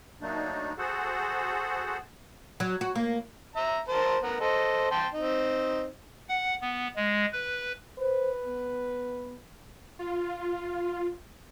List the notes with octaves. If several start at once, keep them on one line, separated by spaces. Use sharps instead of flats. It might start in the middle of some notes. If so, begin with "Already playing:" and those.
F#3 A3 A#3 D4 D#4
F#4 G#4 A4 C5 F#5
F#3
F#4
A#3
E5 A#5
A#4 C5 A5
B3 A#4
A4 C5 D#5
G5 A5 C6
C4 D#4
F#5
B3
G#3
B4
B4 C5
B3
F4